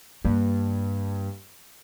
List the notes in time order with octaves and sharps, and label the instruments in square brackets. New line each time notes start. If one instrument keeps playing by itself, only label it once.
[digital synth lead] G2 [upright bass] A#3